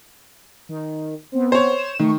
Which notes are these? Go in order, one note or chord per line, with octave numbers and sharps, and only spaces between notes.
D#3
B3 C4
C5 C#5
E7
D#3 A3 C#6